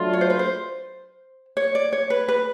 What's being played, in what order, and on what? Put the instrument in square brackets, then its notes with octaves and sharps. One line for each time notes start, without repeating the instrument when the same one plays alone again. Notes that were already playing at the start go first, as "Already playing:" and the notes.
Already playing: [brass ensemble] F#3 A3 D4 F4
[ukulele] C#5
C5
B4
C5
C#5
D5
C#5
B4
B4